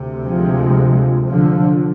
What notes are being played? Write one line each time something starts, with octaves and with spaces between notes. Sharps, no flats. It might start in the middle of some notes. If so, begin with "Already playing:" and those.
Already playing: D2 C3
F3 G#3
D3 F3